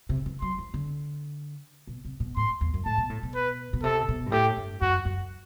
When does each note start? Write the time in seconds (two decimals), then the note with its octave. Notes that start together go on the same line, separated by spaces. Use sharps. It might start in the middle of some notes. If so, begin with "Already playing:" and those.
0.09 C3
0.26 E3
0.41 F#3 C6
0.58 E3
0.74 D3
1.87 B2
2.05 C3
2.20 B2
2.37 A2 C6
2.61 E2
2.74 F#2
2.85 A2 A5
2.98 B2
3.10 A2
3.23 B2
3.35 B4
3.73 B2
3.83 C3 A4
4.08 B2
4.26 G2
4.32 A2 G4
4.57 G2
4.81 F#2 F#4
5.05 F#2